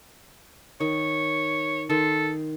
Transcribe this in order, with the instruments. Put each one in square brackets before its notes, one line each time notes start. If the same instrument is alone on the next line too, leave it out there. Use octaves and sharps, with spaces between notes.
[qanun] D#3 [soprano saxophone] C#5
[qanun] D#3 C6 [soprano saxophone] A4